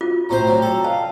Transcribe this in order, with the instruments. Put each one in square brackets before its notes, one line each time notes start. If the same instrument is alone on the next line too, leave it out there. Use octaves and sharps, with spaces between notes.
[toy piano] F4 [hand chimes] F#4
[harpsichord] A2 C4 C5 [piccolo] A#5
[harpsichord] F#3 [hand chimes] D5 G5
[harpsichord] A4
[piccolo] F5 [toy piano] A5